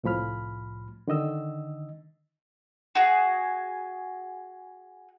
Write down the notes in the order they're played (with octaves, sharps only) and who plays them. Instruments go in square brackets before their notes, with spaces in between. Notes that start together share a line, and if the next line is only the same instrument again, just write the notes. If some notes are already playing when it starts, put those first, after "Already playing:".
[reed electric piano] C2 A2 F3 B5 F6
D3 D#3 D#5 E6
[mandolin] F#4 G#4